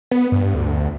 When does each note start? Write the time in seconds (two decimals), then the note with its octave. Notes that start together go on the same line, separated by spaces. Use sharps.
0.11 B3
0.32 G2
0.55 D2